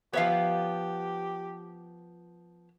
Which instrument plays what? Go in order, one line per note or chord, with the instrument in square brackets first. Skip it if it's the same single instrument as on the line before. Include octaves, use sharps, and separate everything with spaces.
[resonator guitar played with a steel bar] F3 B3 [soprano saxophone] G4 [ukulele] C#5 E5 F5